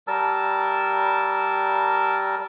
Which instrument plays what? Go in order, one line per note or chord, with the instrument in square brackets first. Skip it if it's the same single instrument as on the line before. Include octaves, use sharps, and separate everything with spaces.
[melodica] G3 A#4 A5 E6